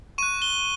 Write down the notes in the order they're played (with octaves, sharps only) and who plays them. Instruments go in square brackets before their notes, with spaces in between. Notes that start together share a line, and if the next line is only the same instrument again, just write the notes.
[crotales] C#6 F#6 D#7
G7